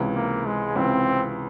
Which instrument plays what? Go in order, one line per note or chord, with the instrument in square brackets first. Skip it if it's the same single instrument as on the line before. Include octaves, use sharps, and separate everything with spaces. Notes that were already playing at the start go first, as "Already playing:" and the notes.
Already playing: [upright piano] C#2 C3 E3
[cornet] A#3
G#3
[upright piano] C#2 C3 E3 [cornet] C4